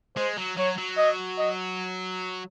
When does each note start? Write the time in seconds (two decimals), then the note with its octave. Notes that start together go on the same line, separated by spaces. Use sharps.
0.16 G#3 C5
0.37 F#3
0.57 F#3 C#5
0.78 F#3
0.98 D#5
1.38 D#5